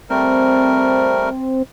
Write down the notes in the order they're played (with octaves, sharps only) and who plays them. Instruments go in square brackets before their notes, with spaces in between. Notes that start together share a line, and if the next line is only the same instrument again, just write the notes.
[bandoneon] G3 A3 A#4 [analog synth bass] C4